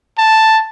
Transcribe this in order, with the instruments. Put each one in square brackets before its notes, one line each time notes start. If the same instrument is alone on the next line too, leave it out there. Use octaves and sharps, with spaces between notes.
[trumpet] A5